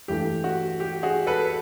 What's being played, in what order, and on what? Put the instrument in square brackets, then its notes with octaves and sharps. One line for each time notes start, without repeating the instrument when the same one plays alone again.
[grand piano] G2 E3 A3 G4
F#4
G4
F#4 G#4
A4 B4